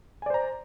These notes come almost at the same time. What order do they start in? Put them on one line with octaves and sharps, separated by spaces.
G#5 D5 C5 A#5